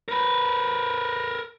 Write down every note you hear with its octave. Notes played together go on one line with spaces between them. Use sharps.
A#4 B4